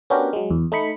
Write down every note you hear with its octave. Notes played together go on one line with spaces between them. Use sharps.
B3 C#4 D4 F#4 G4 A#4
F#3 G#3
E2
A3 D#4 B5 C#7